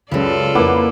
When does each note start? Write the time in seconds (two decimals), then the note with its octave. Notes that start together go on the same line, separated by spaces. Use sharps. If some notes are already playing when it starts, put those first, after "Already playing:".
0.11 C#2 F#2 C#3 F4 A4 B4 D5
0.55 F2 A#3 E4 B4 F#5 D6